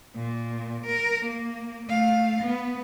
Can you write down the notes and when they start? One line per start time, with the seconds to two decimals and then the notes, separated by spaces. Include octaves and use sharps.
0.15 A#2
0.87 A#4
1.26 A#3
1.88 A3 F5
2.42 B3